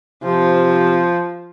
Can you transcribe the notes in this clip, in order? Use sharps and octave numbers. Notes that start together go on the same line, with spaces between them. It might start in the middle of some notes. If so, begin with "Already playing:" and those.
C3 F3